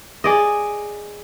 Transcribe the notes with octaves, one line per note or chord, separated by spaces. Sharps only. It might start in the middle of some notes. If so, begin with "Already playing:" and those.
G#4 D5 D#5